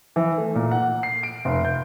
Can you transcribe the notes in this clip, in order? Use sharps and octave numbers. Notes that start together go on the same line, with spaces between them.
E3
A3
A#2
F#5
C7
D7
F1
G6